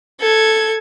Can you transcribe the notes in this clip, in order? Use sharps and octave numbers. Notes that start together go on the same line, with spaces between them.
A4 G#6